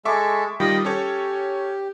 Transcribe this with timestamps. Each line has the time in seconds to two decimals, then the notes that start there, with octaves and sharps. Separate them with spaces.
0.05 G#3 A4 E5 C#6 D6
0.60 D#3 G3 F4 D#5 G5 B5
0.85 C#4 G4 A4 C#5